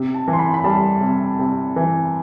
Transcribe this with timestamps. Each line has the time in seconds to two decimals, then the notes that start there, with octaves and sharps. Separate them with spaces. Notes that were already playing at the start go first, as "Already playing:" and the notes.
Already playing: C3
0.14 A5
0.28 E3
0.33 C6
0.39 B5
0.54 B5
0.64 G3 A5
1.01 C3
1.39 C3
1.76 E3